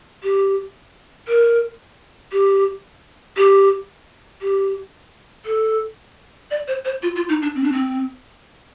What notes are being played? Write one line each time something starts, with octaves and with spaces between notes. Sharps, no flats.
G4
A#4
G4
G4
G4
A4
D5
C5
C5
F4
F4
D#4
D4
C4
D4
C4